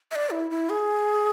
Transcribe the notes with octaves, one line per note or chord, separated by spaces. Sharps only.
E5
D5
E4
E4
G#4